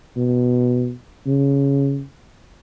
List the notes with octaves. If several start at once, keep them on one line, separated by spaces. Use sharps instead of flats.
B2
C#3